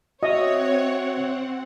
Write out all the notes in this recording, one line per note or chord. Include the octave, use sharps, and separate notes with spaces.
C4 F#4 C#5 D#5 E5 F#5